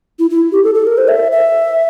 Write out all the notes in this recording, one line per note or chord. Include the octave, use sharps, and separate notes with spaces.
E4
E4
G4
A4
A4
A#4
C5
E5
E5